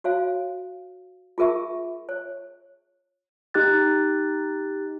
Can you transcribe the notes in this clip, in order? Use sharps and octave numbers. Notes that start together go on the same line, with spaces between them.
F#4 C#5 F5
F4 G#4 A#4 E5 C#6
C#5
D#4 G4 F#6 A6